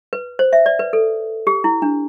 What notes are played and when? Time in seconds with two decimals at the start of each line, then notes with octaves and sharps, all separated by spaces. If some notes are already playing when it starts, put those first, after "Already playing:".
0.13 B4
0.39 C5
0.53 E5
0.66 D5
0.79 B4
0.93 A4
1.47 G4
1.64 E4
1.82 D4